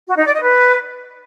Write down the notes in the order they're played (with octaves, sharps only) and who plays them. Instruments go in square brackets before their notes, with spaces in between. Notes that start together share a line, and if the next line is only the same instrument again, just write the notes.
[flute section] F#4
D#4
D5
D#5
B4